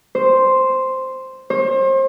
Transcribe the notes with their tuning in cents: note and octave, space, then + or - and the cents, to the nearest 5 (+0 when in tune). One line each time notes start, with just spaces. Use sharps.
C5 +0
C5 +35